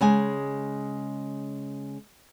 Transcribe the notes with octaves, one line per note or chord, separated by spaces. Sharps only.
C#3 G#3 G#5